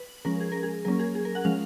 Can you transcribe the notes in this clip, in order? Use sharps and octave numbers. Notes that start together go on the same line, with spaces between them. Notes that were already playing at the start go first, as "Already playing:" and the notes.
Already playing: B4
F3 G#3 C#4 A#4
G#4
A#4
G#4
F#3 A#3 C#4 A#4
G#4
G#4
A#4
F#5
F3 G#3 C#4 F5